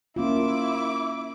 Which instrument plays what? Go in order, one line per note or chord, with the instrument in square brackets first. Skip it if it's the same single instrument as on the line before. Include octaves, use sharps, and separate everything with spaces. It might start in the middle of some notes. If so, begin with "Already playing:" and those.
[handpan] A#3 C#4 F4 [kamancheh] E4 D6